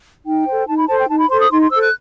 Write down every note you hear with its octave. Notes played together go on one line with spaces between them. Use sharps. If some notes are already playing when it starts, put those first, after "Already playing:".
D#4 G5
A4 C5
D#4 A5
B5
A4 C5 A5
G5
D#4 A5
B5
A4 C5 C6
D#6
D#4 C6
C6
A4 C5 E6
F#6